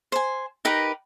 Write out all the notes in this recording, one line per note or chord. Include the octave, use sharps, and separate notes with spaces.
C5 G#5
D#4 G4 A#4 B4